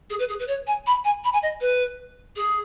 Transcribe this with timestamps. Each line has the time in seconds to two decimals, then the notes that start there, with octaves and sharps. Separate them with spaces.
0.10 G#4
0.19 B4
0.29 G#4
0.39 B4
0.48 C#5
0.67 G#5
0.87 B5
1.05 G#5
1.24 B5
1.33 G#5
1.43 D#5
1.61 B4
2.36 G#4